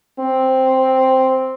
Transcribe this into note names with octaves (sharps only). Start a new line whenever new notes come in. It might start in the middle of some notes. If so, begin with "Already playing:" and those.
C4